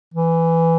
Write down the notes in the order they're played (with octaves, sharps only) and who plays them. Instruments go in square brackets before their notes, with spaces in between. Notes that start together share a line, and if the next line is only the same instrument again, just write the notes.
[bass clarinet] E3